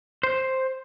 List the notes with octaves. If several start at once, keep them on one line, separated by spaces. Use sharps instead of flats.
C5